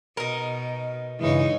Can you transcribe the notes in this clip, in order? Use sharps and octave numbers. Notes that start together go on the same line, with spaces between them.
B2 D#4 A#4
G2 C#3 E3 G#3 D#4 C#5